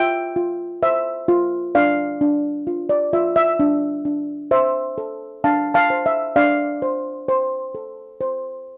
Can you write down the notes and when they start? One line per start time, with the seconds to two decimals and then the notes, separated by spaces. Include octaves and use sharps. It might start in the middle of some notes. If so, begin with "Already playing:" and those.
Already playing: F4 E5 G5
0.36 F4
0.83 C5 E5
1.28 F4
1.75 D4 D5 F5
2.21 D4
2.67 F4
2.89 D5
3.13 F4 E5
3.36 E5
3.60 D4
4.05 D4
4.51 C5 E5
4.98 A4
5.44 D4 F5 A5
5.74 F5 A5
5.90 C5
6.06 E5
6.36 D4 D5 F5
6.82 C5
7.28 C5
7.75 A4
8.21 C5